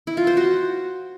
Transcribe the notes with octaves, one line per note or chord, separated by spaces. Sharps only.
E4
F4
C5
F#4